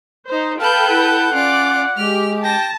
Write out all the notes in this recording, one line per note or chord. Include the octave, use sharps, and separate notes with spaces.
D#4 C5
A4 B4 F5 G5 A5 G6
E4 F#5
C#4 F4 D5 D6
G#3 G4 F6
G5 A5 A#6